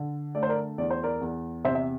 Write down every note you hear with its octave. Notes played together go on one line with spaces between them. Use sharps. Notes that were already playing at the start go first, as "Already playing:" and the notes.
Already playing: D3
A3 D5
C5
A#4 D5
E2 D5
C5
A#4 D5
E2
C3 C5 E5
E5